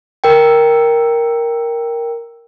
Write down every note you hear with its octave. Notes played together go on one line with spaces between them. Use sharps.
A#4 G5